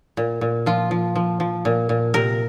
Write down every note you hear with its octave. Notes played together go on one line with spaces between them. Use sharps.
A#2
A#2
F3 F4
F3
F3
F3
A#2
A#2
C3 A#4